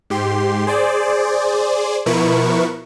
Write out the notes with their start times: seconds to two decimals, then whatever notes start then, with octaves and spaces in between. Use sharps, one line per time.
0.10 G#2 G4 C6
0.67 G#4 C5 D5
2.06 B2 F3 E4 A#4 B4 C#6